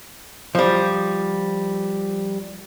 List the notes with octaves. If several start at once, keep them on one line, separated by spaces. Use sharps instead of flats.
F3 G3